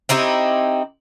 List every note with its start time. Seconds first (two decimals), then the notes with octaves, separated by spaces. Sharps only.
0.09 C4 D#4 E4 G4